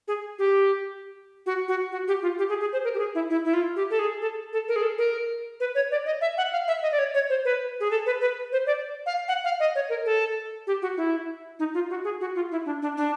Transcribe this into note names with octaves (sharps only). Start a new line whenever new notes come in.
G#4
G4
F#4
F#4
F#4
G4
F4
G4
G#4
G#4
C5
A#4
G4
G#4
E4
E4
E4
F4
G4
A4
G#4
A4
A4
A#4
G#4
A4
A#4
B4
C#5
D5
D#5
E5
F#5
F5
E5
D#5
D5
C#5
C#5
C5
B4
G#4
A4
B4
B4
C5
D5
F5
F#5
F5
D#5
C#5
A#4
A4
G4
F#4
E4
D#4
F4
F#4
G#4
F#4
F4
E4
D4
D4
D4